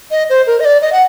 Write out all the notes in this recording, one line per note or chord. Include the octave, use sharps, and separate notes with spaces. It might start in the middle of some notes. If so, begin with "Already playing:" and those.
D#5
C5
A#4
D#5
D5
D#5
F#5